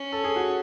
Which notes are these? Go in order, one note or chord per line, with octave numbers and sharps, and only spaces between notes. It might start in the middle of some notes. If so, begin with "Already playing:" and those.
Already playing: C#4
A4
G#4
F#4